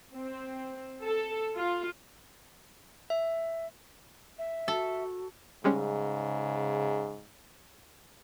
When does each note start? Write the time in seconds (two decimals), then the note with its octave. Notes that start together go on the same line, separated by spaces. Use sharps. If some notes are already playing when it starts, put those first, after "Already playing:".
0.12 C4
1.03 A4
1.55 F4
3.10 E5
4.39 E5
4.68 F#4 A4
5.64 G#2 C#3 G3 G#3 C#4